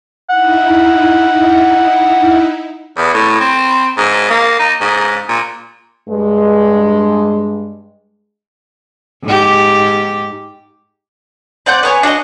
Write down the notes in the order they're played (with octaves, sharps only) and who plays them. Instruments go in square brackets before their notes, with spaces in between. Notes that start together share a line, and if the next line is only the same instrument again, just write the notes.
[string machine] D#4 E4 [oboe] F#5
[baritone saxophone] E2
A2
C4
G#2
A#3
D#4
G#2
A#2
[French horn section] G2 G#3
[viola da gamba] G#2 G4
[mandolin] C4 D5 F#5 G6
B3 C#5 G#5
D4 F#4 D5 D#5